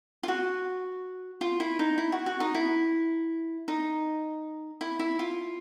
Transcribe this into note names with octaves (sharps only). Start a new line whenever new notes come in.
F4
F#4
F4
E4
D#4
E4
F#4
F#4
D#4
E4
D#4
E4
E4
F4